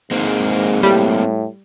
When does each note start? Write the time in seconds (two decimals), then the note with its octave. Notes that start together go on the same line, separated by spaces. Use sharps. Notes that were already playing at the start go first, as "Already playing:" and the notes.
0.11 G#2 G#3 A#3 C4
0.83 A2 G3